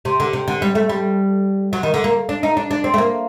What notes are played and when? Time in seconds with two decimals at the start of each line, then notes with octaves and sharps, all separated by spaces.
0.05 C3
0.20 D3
0.33 C3
0.48 D3
0.62 G3
0.75 A3
0.89 G3
1.73 F#3
1.83 D#3
1.94 D3
2.04 A#3
2.29 D4
2.43 D#4
2.57 D4
2.71 D4
2.84 C4
2.94 A3
2.98 A#3